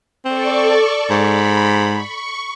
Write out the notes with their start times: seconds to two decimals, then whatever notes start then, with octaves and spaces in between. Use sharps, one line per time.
0.25 C4 A4 D5 C#6
1.10 G#2 B5
1.94 C#6